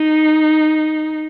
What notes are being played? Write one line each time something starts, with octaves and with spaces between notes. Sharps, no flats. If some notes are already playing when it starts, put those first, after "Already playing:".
Already playing: D#4